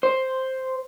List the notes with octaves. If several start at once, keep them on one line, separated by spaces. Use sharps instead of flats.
C5